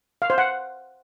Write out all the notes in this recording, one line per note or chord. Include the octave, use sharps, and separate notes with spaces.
F5
C5
F#5